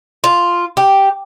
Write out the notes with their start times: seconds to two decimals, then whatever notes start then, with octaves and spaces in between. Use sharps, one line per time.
0.24 F4
0.77 G4